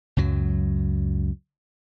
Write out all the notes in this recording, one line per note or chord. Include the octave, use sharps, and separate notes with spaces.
C#2 F#2 F#3